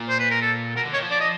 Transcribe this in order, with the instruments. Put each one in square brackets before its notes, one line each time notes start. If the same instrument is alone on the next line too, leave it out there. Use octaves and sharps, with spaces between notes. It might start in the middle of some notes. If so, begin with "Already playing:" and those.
Already playing: [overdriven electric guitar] A#2
[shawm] C5
B4
A#4
A4
[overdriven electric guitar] B2 [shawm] A#4
[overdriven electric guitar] D3
[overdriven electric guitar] D#3 [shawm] C#5
[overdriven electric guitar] F3
[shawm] D5
D#5